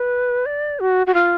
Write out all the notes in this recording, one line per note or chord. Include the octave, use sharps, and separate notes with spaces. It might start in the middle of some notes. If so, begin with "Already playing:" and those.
Already playing: B4
D5
F#4
F#4
F4